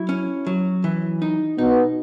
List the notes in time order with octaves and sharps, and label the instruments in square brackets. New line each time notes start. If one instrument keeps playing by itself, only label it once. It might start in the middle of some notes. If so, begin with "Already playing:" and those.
Already playing: [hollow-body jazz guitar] F#3 E4
C#4
F#3
E3
D#4
[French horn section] B2 B3 [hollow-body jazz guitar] D#4